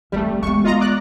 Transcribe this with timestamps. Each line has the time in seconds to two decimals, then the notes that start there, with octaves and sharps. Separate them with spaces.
0.12 E3 G3 A3 C4
0.43 G#3 B3 C#6
0.64 F4 D#5 A#5
0.80 D5 F#6